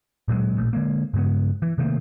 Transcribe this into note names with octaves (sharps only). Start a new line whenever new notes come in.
D1 A#2 F#3 G#3
A1 A#2 A3
D3 G#3 A#3
G2 C#3 G#3 B3
E3
C3 D#3 A3 A#3